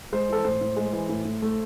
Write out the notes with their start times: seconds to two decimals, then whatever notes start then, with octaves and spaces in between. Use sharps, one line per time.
0.12 G#3 C5
0.29 E3 A4
0.45 A2 C5
0.61 A2
0.77 G#3
0.93 E3
1.09 A2
1.25 A2
1.42 A3